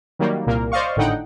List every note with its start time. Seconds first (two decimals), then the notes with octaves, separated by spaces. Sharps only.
0.19 D#3 F#3 G3 A#3
0.46 C2 A#2 A#3 A#4
0.72 C5 D5 D#5 F5 C#6
0.96 G#1 A2 D3 D#4 F#5 G5